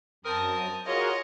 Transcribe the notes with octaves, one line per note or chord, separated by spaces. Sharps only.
F#2 C4 A#4 A5 D#6
F4 F#4 G#4 A#4 C#5 D#5